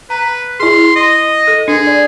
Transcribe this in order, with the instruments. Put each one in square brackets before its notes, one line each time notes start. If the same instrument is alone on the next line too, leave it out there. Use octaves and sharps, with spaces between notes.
[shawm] B4 [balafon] A#5
[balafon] E4 G#4 [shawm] C6
[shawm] D#5
[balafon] A4
[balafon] D4 [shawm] G#4
[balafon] D5